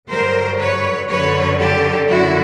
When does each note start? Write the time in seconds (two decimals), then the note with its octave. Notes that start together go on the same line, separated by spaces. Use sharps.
0.09 G2 D3 F#3 A#4 C5
0.59 B4 C#5
1.09 F#2 D3 F#3 B4 C#5
1.59 G4 A4
2.08 F#2 D3 F#3 E4 F#4